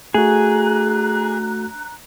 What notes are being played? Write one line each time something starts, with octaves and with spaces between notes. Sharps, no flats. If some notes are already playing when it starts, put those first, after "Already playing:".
A3 D4 F#4 G#4 A#5 F#6